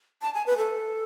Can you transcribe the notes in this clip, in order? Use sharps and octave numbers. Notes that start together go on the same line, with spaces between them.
A5
G#5
B4
A4